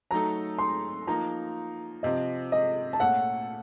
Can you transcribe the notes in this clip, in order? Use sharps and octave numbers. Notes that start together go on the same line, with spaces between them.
F#3 A3 D#4 A4 A#5
C6
F3 A#3 D#4 A#5
C3 F3 C4 D#5
D#5
A5
A#2 A3 C#4 A4 F#5